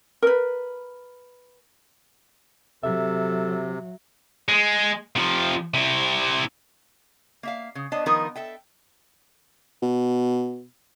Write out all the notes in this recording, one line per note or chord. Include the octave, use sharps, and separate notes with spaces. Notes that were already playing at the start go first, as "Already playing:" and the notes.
A#4 B4
C3 F#3 A4 E5
G#3
C3 F3
C3 E4
A#3 E5 F5
C#3
B3 D4 C#5 D#5 A5
D#3 F3 G3 B3 D#4 A#4
A4 E5 G5
B2